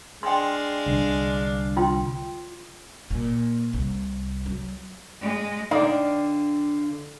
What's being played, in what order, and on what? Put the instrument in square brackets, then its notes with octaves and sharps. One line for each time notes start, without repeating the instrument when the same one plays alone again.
[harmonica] G#3 D4 F5 [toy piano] G5 C6
[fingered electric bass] C2 D3
[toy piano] F4 G5 C6
[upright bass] A#2
C2
F#3
[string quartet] G#3
[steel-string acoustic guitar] D3 [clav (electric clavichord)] D#4 [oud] D5 [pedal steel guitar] F5 G5 D6